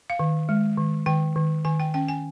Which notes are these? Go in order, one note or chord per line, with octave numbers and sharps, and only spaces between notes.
F5
D#3
G#3
D#3
D#3 G5
D#3
D#3 G#5
G5
C#4 G5
G#5